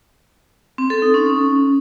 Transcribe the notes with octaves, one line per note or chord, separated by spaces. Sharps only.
C4
A4
D#4
C#4